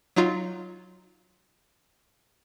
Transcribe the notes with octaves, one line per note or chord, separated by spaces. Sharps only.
F#3 D#4 F4